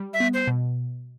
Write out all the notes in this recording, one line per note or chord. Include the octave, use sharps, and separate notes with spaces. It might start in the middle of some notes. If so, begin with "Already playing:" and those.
Already playing: G3
E5
B3
C5
B2